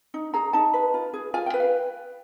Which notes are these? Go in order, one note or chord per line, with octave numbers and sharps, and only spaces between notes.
D#4
G#4 A#5
D#4 A5
B4
F4
G#4
F4 G#5
G5
B4
F5